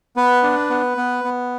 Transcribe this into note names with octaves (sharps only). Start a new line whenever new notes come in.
B3 B4
D4
B3
B3
B3